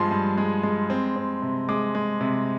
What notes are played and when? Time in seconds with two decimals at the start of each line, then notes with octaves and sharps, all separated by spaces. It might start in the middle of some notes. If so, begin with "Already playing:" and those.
Already playing: G2 F3 G#3 C6
0.11 G2
0.38 G#3
0.63 G#3
0.90 C4
1.16 C4
1.42 C3
1.69 G#3 D6
1.95 G#3
2.21 C3